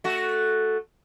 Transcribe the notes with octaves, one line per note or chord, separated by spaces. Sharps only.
A3 F#4